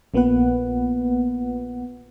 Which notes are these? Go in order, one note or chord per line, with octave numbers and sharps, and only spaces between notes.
A#1 A#3 B3 F4 B4 F#5